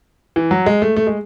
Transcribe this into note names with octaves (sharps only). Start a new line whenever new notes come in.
E3
F#3
G#3
A3
A3
G#3